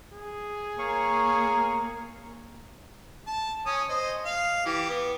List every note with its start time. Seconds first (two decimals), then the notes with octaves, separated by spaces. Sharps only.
0.13 G#4
0.79 A#3 C#5 F5 A#5 C#6
3.27 A5
3.66 C#4 D#6
3.89 C5 D#5
4.26 F5
4.66 E3 G4
4.89 B3